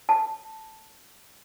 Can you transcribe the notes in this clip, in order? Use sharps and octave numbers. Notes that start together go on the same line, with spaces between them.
A5